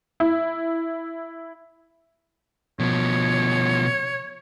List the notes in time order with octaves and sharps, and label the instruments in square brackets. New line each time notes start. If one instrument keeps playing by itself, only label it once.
[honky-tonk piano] E4
[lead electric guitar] B2 F3 [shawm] C#5